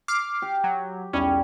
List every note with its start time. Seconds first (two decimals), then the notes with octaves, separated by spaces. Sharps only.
0.08 D6 F6 C7
0.42 G4
0.64 F#3
1.13 B1 E2 G3 C#4